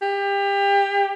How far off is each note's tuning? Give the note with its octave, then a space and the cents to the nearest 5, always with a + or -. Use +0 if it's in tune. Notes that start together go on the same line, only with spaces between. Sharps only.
G4 +30